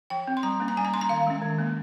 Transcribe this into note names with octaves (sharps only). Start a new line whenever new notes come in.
F3 G5
C4
C6
G3 A#5
A#3 C#4
A#5
G3 G#5
A#5
C#4 C6
A#5
D#3 F5
G#3 C#4
D#3
A#3 C#4